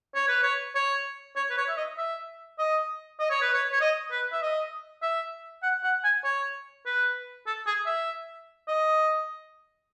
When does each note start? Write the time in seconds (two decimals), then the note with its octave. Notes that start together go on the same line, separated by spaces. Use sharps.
0.15 C#5
0.28 B4
0.43 C#5
0.75 C#5
1.36 C#5
1.50 B4
1.57 C#5
1.68 E5
1.77 D#5
1.98 E5
2.59 D#5
3.19 D#5
3.30 C#5
3.42 B4
3.54 C#5
3.72 C#5
3.81 D#5
4.11 B4
4.32 E5
4.42 D#5
5.02 E5
5.63 F#5
5.84 F#5
6.04 G#5
6.24 C#5
6.86 B4
7.47 A4
7.67 G#4
7.86 E5
8.68 D#5